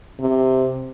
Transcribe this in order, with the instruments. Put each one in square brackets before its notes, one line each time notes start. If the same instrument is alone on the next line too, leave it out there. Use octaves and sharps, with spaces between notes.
[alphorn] C3